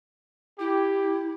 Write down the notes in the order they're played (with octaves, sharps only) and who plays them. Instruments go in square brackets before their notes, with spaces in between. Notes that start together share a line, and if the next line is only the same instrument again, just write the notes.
[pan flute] E4 [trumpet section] G4